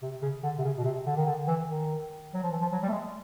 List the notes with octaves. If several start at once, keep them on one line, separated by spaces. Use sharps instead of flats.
C3
C#3
D3
C3
C#3
B2
C3
D3
D#3
D3
E3
D#3
F#3
F3
E3
F3
F#3
G3
A3
G#3